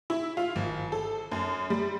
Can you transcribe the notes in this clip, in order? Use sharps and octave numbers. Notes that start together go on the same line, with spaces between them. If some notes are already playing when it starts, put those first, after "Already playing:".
E4
F4
G#1
A4
F#2
G3